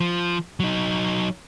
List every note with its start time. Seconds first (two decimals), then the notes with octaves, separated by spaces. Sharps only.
0.01 F3
0.60 F#3 D#4